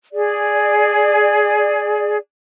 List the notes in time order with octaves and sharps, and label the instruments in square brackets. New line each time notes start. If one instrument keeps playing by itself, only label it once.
[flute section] G#4 D5